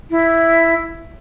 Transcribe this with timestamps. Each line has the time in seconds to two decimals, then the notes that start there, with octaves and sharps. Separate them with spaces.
0.10 E4